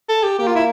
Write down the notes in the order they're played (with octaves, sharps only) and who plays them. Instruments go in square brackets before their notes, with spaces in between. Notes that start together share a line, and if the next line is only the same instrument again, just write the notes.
[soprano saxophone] A4
G4
[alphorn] A#3 [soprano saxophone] G4
[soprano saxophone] F4
E4